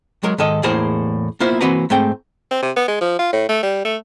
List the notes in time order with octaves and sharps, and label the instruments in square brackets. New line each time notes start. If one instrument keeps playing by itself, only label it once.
[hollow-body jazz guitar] F#3 G#3 A#4
G#2 D#3 A4 D#5
E2 A2 A#3 G#4 C5 A#5
A#3 B3 E4 F4 C5
E3 A#3 C4 F#4 B4 A#5
G#2 A3 C4 G5
[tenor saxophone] C4
C3
B3
G#3
F3
F4
A2
A3
G3
A3